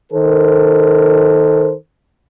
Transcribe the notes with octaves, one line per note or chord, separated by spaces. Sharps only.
D#3 A4 A#4 C5